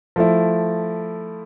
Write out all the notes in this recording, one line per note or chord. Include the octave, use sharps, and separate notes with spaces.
F3 A3 E4